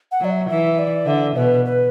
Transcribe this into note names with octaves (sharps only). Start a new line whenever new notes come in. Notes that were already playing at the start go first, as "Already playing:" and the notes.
F#5
F#3 D5
E5
E3 E5
D5
D3 E5
B2 B4
B4